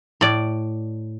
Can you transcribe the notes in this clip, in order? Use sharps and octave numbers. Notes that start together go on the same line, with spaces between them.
A2 D5